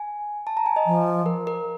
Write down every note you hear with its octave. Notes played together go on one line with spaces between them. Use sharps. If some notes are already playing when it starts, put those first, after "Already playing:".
Already playing: G#5
A5
A#5
G#5
D#5
F3
A#4
A#4